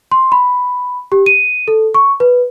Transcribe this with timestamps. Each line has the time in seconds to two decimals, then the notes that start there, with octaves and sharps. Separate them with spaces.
0.11 C6
0.32 B5
1.12 G4
1.26 D#7
1.68 A4
1.94 C#6
2.20 B4